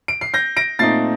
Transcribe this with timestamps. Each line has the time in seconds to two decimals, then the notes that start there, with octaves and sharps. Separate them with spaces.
0.08 D7
0.21 C7
0.34 G6 A#6
0.57 A#6 D7
0.79 A#2 A3 C4 D#4 A6 C7